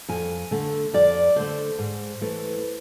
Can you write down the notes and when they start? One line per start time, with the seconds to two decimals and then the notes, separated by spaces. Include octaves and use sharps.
0.09 F2 G#5
0.51 D3 A3
0.93 F2 D5
1.36 D3 A3 C5
1.79 G#2
2.21 E3 A3